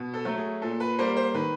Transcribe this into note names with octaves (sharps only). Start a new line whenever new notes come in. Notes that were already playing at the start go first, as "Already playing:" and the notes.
Already playing: B2
A4
F#3 A3
G#4
A#2 A4
B4
G3 A#3 C5
C5
D#3 B4